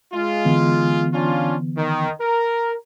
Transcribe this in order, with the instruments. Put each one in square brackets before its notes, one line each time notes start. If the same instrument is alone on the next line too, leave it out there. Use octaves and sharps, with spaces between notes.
[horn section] G#3 F4
[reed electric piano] D3 E3 B3
[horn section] C#4 D4 F4
D#3
A#4